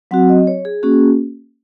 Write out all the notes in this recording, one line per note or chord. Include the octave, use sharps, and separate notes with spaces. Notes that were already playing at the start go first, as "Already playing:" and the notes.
F#3 C4 F#4 F#5
D#5
C#5
G#4
A#3 C#4 F#4 G#4